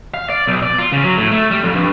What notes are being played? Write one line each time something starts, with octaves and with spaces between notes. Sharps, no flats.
F5
D5
B1
D5
F4
C#3
F#3
A2
A3
G3
F2
G2